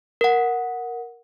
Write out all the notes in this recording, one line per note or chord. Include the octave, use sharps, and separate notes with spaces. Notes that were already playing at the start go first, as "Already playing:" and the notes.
A#4 F#5